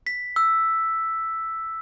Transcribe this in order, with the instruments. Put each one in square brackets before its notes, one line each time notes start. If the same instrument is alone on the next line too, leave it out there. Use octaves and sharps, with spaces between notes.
[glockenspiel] B6
E6